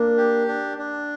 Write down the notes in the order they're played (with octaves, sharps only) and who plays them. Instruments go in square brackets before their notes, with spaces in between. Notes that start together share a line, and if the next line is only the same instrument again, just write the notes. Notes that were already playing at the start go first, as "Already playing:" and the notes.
Already playing: [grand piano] A#3 [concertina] D4
[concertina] G4
D4
D4